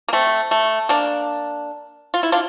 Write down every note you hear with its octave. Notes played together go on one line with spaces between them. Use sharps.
A#3
A3 C4
A3
A#3 D4
F4
E4
D4 F4